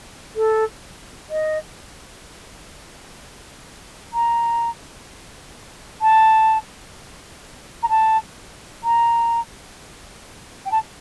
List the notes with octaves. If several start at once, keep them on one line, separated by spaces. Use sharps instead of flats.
A4
D#5
A#5
A5
A#5
A5
A#5
G5
A5